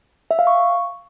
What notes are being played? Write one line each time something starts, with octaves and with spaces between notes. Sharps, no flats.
E5
F5
C#6